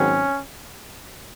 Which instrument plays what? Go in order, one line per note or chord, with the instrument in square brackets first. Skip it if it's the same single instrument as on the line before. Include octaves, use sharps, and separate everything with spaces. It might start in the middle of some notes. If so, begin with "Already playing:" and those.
Already playing: [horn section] G#2 D#3 F#3 C4 C#4